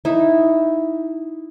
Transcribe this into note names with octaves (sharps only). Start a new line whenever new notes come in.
D#4 E4